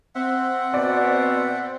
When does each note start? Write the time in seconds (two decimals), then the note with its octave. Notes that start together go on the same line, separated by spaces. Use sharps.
0.15 C4 E5 F#5
0.74 B2 D5